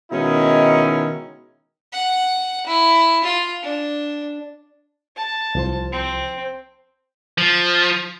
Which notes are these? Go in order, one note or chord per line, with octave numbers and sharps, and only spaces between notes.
B2 D#3 G#3 C#4 D#4 E4
F#5
E4
F4
D4
A5
C2 F3 C5
C4
F3